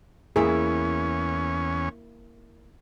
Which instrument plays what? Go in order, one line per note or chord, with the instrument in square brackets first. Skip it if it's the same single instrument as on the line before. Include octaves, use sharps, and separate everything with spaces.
[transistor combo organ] E2 C#4 [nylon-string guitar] A#3 E4 [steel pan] G#4